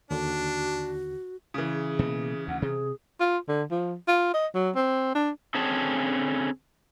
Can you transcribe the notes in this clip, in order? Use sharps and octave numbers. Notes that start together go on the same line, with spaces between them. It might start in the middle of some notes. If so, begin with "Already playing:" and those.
D#2 D3 D4 F#4
C#3 E3
G#4
B2 A#3
D2 F#5
C3 G#4
F4
D3
F3
F4
D#5
F#3
C4
D4
D3 C4 C#4 G#4 A5